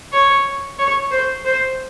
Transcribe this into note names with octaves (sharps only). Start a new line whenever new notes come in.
C#5
C#5
C5
C5